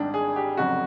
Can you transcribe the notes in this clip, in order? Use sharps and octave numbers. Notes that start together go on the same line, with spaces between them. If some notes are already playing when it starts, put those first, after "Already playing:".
Already playing: G#1 G#2 G3 D4
G#4
G4
F1 F2 C#3 F#3 F#4